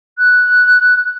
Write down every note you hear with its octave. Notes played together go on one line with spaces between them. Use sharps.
F#6